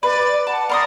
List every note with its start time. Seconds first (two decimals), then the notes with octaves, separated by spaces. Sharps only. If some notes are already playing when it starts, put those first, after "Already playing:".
0.03 B4 D5
0.47 F#5 A5
0.69 A#4 D5 C6 D#6